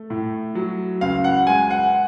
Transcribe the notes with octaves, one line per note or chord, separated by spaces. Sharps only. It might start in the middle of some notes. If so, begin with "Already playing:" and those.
Already playing: A3
A2
F#3
C#2 F5
F#5
G#3 G#5
F#5